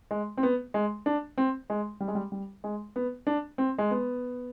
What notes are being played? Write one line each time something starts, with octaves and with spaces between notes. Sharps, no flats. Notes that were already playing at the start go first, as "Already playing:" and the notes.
G#3
C4
B3
G#3
D4
C4
G#3
G3
G#3
G3
G3
G#3
B3
D4
C4
G#3
B3